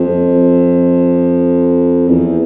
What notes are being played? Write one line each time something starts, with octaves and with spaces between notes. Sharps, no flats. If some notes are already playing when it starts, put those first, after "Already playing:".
Already playing: F2
E2